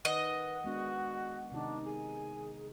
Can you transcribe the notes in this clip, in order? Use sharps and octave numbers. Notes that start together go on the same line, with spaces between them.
D#3 B4 D#5 F#5
G#3 B3 D4 F#4
C3 D#3 D4 D#4
G#4 G#5